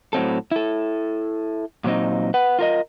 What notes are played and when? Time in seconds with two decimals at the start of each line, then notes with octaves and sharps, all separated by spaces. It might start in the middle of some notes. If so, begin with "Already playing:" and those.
0.13 A2 F#3 C4 A4
0.51 E4 A4
1.84 A#2 F#3 C4 D#4
2.34 B4 F#5
2.59 F4 A#4 D#5